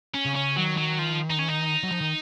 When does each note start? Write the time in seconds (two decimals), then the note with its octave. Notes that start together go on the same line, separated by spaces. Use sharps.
0.14 C#4
0.25 C#3
0.35 C#4
0.56 D#3 F#3
0.78 F#3
0.99 F3
1.30 D#4
1.39 C#4
1.48 D#4
1.83 F#3
1.91 F3
2.01 D#3